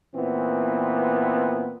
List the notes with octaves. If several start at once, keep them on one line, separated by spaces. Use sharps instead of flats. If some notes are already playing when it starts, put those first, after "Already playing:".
A#2 E3 B3 C4